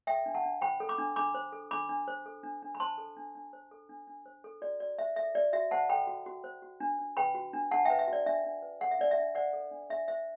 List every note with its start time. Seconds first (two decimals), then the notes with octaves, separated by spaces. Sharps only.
0.07 A4 E5 G5
0.26 D4
0.35 F#5 A5
0.43 D4
0.61 C5 G5 B5
0.80 A4
0.89 B5 D6
0.98 D4
1.16 D4 B5 D6
1.34 C5
1.53 A4
1.71 D4 B5 D6
1.89 D4
2.08 C5
2.26 A4
2.43 D4
2.63 D4
2.75 B5
2.80 C5 A5 C6
2.98 A4
3.17 D4
3.35 D4
3.53 C5
3.71 A4
3.89 D4
4.07 D4
4.26 C5
4.44 A4
4.62 F#4 D5
4.80 F#4 D5
4.99 C5 E5
5.16 A4 E5
5.35 F#4 D5
5.53 F#4 E5
5.71 C5 F#5 A5
5.89 A4 G5 B5
6.07 F#4
6.26 F#4
6.44 C5
6.62 F#4
6.80 D4
6.99 D4
7.17 B4 G5 B5
7.35 F#4
7.53 D4
7.71 D4 F#5 A5
7.85 E5 G5
7.90 B4
7.99 E5
8.07 F#4
8.13 D5
8.26 D4 E5
8.44 D4
8.63 B4
8.81 A4 F#5
8.91 E5
8.99 D4 D5
9.11 E5
9.17 D4
9.35 C5 D5 F#5
9.53 A4
9.71 D4
9.90 D4 E5
10.08 C5 E5